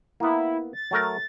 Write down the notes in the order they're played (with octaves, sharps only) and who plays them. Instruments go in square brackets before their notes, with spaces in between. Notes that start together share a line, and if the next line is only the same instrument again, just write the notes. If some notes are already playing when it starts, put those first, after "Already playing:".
[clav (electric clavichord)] A#3 B3 [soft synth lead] E4
[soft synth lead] A6
[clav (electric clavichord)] F#3 A3 A#4